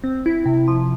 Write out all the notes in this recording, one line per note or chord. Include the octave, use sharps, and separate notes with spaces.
C4
E4
C3
F3